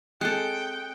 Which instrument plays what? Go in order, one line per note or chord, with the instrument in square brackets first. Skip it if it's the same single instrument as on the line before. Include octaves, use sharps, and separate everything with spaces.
[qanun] G#3 A4 [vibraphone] C4 [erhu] G5 [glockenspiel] D#6 F#6 C#7